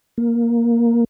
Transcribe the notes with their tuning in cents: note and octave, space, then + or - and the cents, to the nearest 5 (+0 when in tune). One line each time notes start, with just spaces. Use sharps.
A#3 +5